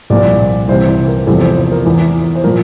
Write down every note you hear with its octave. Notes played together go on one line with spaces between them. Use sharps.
C2 A#2 F3 D5
C2 C3 E3 C5
C5
A#4
E2 C3 F3 A4
C5
C5
A#4
E2 E3
C5
A#2 F3 A#4